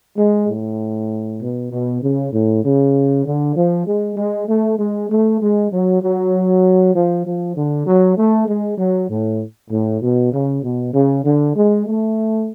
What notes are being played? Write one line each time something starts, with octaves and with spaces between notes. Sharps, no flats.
G#3
A2
B2
B2
C#3
A2
C#3
D3
F3
G#3
G#3
A3
G#3
A3
G#3
F#3
F#3
F3
F3
D3
F#3
A3
G#3
F#3
A2
A2
B2
C#3
B2
C#3
D3
G#3
A3